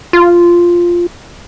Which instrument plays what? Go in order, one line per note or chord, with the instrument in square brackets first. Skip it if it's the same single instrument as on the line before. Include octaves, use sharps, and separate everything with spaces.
[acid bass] F4